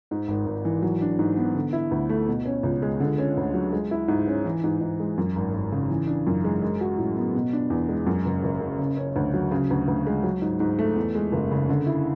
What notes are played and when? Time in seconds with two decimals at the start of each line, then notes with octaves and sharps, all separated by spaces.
0.11 G#2
0.28 G#1
0.46 G#1
0.65 E3
0.82 F#3
1.02 D4
1.19 G#2
1.37 B3
1.55 D3
1.73 E4
1.91 D2
2.09 A3
2.28 B2
2.46 C#4
2.63 C#2
2.82 G#3
3.00 D3
3.18 C#4
3.37 D2
3.54 F#3
3.72 G#3
3.91 E4
4.08 G#2
4.27 C#4
4.46 E3
4.64 G#2
4.81 G#2
5.00 G#3
5.18 F#2
5.36 G#1
5.54 G#1
5.72 C#3
5.90 E3
6.07 D4
6.27 F#2
6.44 G#3
6.62 G#3
6.81 F#4
6.98 A2
7.17 B3
7.35 B2
7.53 D4
7.70 E2
7.89 G#3
8.07 F#2
8.25 F#1
8.43 F#1
8.61 C#3
8.79 C#3
8.97 C#4
9.16 D2
9.34 F#3
9.51 C#3
9.70 D2
9.88 D2
10.07 G#3
10.24 F#3
10.42 G#2
10.60 G#2
10.79 A3
10.96 E2
11.15 G#3
11.32 F#1
11.51 C#3
11.69 D3
11.87 E4